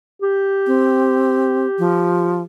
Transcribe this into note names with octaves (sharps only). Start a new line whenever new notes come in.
G4
C4
F3